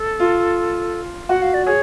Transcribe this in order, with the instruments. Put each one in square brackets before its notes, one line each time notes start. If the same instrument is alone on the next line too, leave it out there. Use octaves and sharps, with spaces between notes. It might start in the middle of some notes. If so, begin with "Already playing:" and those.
Already playing: [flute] A4
[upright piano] F4
[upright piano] F#4 [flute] F#5
[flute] F5
D5
[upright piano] G#4 [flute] C#5